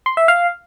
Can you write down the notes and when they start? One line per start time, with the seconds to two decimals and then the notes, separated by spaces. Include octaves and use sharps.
0.06 C6
0.17 E5
0.28 F5